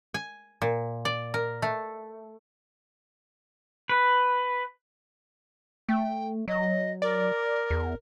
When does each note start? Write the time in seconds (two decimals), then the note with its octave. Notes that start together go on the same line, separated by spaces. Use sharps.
0.14 G#5
0.62 A#2
1.05 D5
1.34 A#4
1.62 A3
3.89 B4
5.89 A3 G5
6.48 F#3 D#5
7.02 A#4 D5
7.70 E2